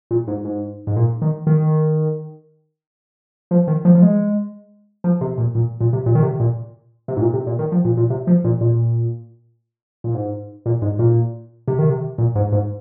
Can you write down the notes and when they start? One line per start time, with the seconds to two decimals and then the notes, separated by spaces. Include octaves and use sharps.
0.11 A#2
0.28 G#2
0.45 G#2
0.87 G#2
0.96 A#2
1.22 D#3
1.47 D#3
3.51 F3
3.68 D#3
3.85 F3
3.95 F3
4.02 G#3
5.04 F3
5.21 C3
5.38 A#2
5.55 A#2
5.81 A#2
5.93 C3
6.06 A#2
6.15 D#3
6.23 C3
6.40 A#2
7.08 C3
7.17 G#2
7.21 A#2
7.34 C3
7.47 A#2
7.59 D#3
7.72 F3
7.85 A#2
7.97 A#2
8.10 C3
8.27 F3
8.44 A#2
8.61 A#2
10.04 A#2
10.14 G#2
10.66 A#2
10.82 G#2
10.99 A#2
11.68 C3
11.79 D#3
11.90 C3
12.18 A#2
12.35 G#2
12.52 G#2